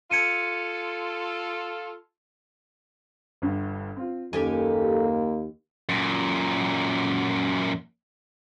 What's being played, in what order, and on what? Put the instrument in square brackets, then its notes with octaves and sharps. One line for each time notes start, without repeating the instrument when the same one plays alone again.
[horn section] F4 A4 [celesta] G#6 C#7 D#7
[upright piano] G1 G2
C4 F4
[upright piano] F#1 [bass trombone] D#2 [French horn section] A#3 [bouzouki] G4 A4 G#5
[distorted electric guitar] F#2 A#2